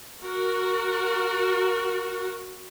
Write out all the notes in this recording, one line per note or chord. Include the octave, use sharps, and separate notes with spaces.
F#4 A#4